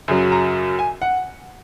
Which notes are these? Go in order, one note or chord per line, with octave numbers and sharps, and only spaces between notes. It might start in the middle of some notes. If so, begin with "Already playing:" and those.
F#2 C#3 F#3
A#5
G#5
F#5